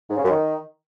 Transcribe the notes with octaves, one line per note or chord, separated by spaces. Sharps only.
G#2
C#3
F#2
D#3